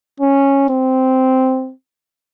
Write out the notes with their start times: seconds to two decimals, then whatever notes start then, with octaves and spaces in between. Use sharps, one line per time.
0.20 C#4
0.69 C4